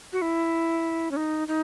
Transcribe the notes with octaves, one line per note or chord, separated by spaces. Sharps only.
F#4
E4
C#4
D#4
D#4